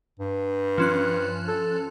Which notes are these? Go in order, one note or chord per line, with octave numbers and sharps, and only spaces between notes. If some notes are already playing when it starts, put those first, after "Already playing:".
G2
F3 C#4 F#6
A4